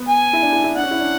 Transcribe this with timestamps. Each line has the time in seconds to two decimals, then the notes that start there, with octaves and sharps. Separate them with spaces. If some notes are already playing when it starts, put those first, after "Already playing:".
Already playing: B3
0.09 G#5
0.33 E4
0.42 D4
0.53 E4
0.64 E4
0.75 D4 F#5
0.83 C#4
0.91 E4
1.00 D4